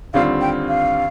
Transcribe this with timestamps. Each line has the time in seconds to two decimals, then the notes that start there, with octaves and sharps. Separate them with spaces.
0.14 D#2 D3 G3 C4 F4 F5
0.41 G5
0.68 F5